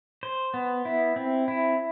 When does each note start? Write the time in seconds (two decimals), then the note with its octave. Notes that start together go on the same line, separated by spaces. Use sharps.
0.23 C5
0.54 B3
0.85 E4
1.16 C4
1.48 E4